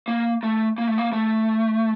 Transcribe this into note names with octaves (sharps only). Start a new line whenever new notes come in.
A#3
A3
A#3
A3
A#3
A3